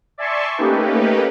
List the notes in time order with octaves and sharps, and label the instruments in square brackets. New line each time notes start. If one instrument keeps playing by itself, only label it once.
[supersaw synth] D5 E5 G#5 A5 C6 C#6
A3 A#3 C#4 D#4 G4 B4